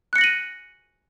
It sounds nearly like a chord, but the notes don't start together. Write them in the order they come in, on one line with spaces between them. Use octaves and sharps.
F#6 C#7 A#6 F#7 D#7